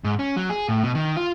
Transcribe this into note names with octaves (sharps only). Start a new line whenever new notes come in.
G#2
C#4
F#3
G#4
A2
B2
D#3
F4